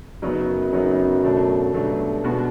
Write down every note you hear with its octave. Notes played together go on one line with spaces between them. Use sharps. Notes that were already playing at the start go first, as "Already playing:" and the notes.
F#2 C#3 F#3 B3 D#4
C#3 F#3 B3 D#4
B2 F#3 A3 D4
G2 B2 F#3 A3 D4
B2 G#3 B3 D4 F#4